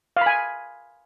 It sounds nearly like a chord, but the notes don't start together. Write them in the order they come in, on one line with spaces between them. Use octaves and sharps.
F5 B5 G#5